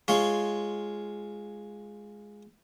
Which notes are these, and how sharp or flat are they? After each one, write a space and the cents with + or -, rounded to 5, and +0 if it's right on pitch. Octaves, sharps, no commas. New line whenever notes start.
G#3 +0 F4 +0 C#5 +0